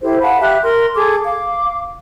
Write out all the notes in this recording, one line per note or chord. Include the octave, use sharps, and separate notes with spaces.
E4 G4 A4 C5
F5 F#5 A5 B5
G4 E5 F#6
A#4 C6
G#4 A4 D6
F5 D6